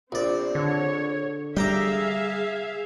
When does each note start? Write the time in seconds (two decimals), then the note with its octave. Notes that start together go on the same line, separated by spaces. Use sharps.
0.12 A#1 C4 D5
0.55 D3 C#5
1.57 G3 G#4 E5 F5 G5 A#5 D6